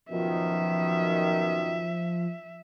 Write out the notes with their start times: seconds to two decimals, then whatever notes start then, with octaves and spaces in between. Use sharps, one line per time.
0.10 F#2 B2 D#3 F3 E5